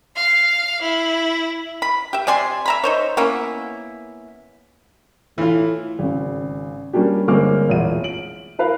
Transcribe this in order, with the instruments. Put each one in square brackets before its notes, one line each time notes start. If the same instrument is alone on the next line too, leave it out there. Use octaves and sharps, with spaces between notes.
[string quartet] F5
E4
[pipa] B5
G4 E5
C3 D5 G#5 C6
E5 A#5 B5
D#4 C5 C#5
A#3 B3 C#4 E4
[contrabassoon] A2 [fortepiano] E3 F4
[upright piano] G#1 C#3
G3 A#3 C#4 D4 G4
G1 G#3 A#3 C4 D6 F6
E1 A1 A#2 E4 D#7
D7 F#7
E4 A#4 B4 F5